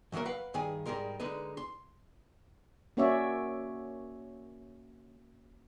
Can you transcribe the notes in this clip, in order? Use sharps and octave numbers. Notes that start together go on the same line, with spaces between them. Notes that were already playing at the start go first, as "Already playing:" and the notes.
F#2 E3 F#3 A#3 A#4
B4 F5 F#5
G2 D#3 G#4 G#5
G#2 G3 G#3 A#4 C6
D3 G#3 D#4 B4
C6
A#3 C#4 F#4 C#5 D5 E5